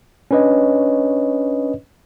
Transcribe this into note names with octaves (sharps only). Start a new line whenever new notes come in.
C#4 D4 B4 C#5 D#5